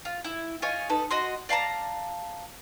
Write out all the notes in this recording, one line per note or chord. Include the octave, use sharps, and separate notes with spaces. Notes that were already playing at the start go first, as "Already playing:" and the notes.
F4
E4
F4 C#5 D#5 G#5
D#4 A4 B4
F#4 D#5 C6
D5 F5 A5 A#5